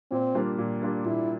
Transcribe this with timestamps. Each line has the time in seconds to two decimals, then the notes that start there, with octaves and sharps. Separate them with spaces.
0.11 A#2 C4
0.35 G3 A#3 D4 F4
0.58 A#2
0.82 G3 A#3 D4 F4
1.05 A#2 E4